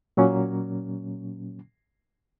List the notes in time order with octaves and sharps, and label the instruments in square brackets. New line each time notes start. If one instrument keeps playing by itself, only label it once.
[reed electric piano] A#2 F#3 A#3 C#4